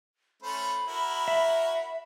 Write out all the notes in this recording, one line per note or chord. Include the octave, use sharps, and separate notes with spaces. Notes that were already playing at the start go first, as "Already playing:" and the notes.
A3 C#4 C5 B5
E4 F#4 A#4
E5